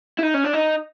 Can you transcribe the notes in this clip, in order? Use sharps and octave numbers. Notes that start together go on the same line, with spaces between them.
E4
D#4
C#4
D4
D#4